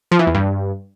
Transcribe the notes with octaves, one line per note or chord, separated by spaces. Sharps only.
F3
E3
E2
G2